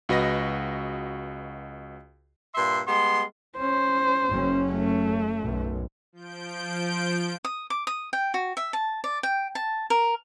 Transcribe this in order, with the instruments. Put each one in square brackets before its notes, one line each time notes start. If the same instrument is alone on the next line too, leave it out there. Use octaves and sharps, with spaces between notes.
[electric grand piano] C#2 F#4 B4 D#5 A#6
[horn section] G2 A#2 E5 C6
G3 G#3 B3 C6
[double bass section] C#4 [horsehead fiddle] C5
[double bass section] F#1 F#3 C#4
[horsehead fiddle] A3
[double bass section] B1 F#2 A2
[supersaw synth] F3 G6 D7
[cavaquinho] D#6
D6
D#6
G5
F#4
E5
A5
D5
G5
A5
A#4